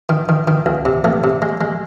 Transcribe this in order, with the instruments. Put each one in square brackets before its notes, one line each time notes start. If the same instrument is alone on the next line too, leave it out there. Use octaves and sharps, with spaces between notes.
[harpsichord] D#3
D#3
D#3
C#2
C3
C2 A3
C3
G#3
G#3